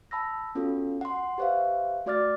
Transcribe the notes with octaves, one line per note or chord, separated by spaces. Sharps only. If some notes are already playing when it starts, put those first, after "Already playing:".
A5 B5 E6 A#6
B3 C#4 F4 F#4 A4
F#5 C6
G4 B4 C5 E5 F5
A3 F#4 D5 D6 F6 A6